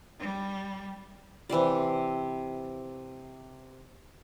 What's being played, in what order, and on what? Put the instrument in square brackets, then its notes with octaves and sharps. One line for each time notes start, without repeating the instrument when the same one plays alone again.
[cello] G3
[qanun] C3 E3 G4 D5